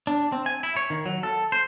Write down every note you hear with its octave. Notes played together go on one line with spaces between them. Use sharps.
D4
C4
G#5
E4
C#5
D#3
F#3
A4
C5